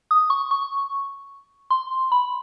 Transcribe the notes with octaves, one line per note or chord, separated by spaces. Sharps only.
D#6
C#6
C#6
C6
B5